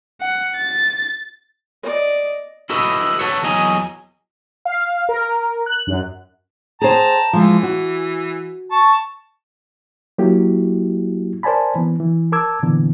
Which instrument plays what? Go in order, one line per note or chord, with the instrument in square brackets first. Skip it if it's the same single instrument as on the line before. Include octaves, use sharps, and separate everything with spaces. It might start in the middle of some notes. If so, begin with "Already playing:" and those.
[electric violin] F#5
A6
[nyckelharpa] D5 D#5
[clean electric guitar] E4 F#4 A4 B4 D#5
F#4 A4 B4 C#5
E2 F#3 D#5 G#5 A#5
[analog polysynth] F5
A#4
F#6
F#2
[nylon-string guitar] G#4 C5 [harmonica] G5 A5 A#5
[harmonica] E3 [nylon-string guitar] F3 G#3
[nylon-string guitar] F#4
[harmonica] A5 C#6
[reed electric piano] F#3 A#3 E4 F#4 G4
A#4 C5 D5 G#5 A5 B5
E3 B3
E3
A#4 A5 D6 E6 G#6
A#2 D3 E3 B3